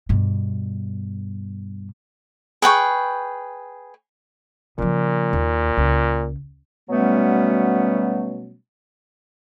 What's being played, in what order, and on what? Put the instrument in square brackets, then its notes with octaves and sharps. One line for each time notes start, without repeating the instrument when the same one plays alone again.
[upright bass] G2 B2
[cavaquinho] G#4 B4 G5 C#6
[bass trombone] A#2 [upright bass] C#3 F3
[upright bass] D#2
C#2
[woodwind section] B2 F#3 G3 A3 B3 C#4